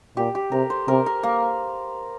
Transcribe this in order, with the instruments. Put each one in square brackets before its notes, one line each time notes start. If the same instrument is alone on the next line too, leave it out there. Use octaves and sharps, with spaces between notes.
[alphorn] A#2 [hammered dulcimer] G4
[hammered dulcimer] G4
[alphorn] C3 [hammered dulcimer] A#4
[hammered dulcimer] C5
[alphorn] C3 [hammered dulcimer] A#4
[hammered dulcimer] A#4
A#3